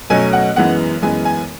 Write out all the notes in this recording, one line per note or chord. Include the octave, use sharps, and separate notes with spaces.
B2 F#3 A3 C#4 G#5
F#5
F#2 E3 G#3 B3 F#5
F#2 E3 G#3 B3 G#5
G#5